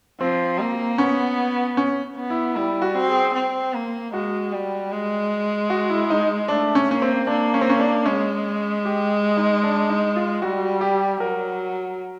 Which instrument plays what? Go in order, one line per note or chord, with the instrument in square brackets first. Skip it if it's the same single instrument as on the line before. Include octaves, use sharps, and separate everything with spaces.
[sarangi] F3 [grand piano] C4
[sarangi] A#3
[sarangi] B3 [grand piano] C#4
[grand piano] C#4
[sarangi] B3
[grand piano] E4
[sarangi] G3 [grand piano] E4
[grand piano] F#4
[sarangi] C4
[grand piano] G#4
[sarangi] C4
A#3
[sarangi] G#3 [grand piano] F#4
[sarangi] G3
G#3
[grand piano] F#4
E4
D#4
[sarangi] A3 [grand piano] D4
[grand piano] C#4
[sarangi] A#3 [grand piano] C#4
[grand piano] C4
[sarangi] A#3 [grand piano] D4
[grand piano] C#4
C4
C#4
D4
[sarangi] G#3 [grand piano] C#4
[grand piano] G4
D#4
D4
D#4
F4
[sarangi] G3 [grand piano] F#4
[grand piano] G4
[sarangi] F#3 [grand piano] A#4